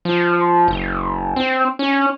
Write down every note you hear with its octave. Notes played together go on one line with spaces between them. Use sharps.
F3
F#1
C4
C#4